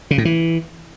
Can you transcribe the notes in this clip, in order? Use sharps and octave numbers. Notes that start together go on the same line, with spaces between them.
C#3
A2
E3